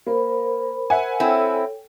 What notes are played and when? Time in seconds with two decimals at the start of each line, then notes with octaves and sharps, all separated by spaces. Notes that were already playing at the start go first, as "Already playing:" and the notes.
0.07 A#3 A#4 C5 B5
0.90 E5 F#5 G#5
1.20 C4 E4 A4 C#5 G5